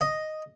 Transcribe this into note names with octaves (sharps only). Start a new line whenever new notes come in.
D#5